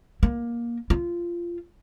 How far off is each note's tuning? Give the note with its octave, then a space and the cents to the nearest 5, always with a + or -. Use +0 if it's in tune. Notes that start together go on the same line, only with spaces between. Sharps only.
A#3 +15
F4 -15